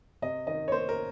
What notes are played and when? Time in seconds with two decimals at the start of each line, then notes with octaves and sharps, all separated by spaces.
0.22 C3 D#5
0.47 D#3 D#5
0.68 C#5
0.72 A#3 C5
0.89 A#4